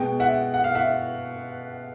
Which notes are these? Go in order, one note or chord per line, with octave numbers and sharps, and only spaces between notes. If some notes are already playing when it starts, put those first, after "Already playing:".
Already playing: B2 G#3 G5
E5 F#5
F#5
F5
E5 F#5